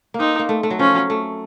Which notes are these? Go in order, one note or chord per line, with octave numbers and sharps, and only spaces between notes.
A#3
C4 D#4
A#3
A3
A3
F#3
F3 C#4
F#3
A3